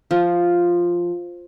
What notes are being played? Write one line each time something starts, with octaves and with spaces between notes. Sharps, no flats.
F3